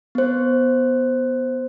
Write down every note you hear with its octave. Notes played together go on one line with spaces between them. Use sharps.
B3 C5